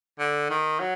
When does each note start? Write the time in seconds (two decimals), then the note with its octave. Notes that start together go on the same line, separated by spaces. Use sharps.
0.19 D3
0.50 D#3
0.80 F#3